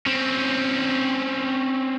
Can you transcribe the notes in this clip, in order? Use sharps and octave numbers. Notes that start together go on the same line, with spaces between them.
C4 C#4